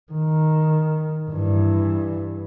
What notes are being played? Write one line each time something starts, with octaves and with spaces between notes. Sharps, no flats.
D#3
G2 E3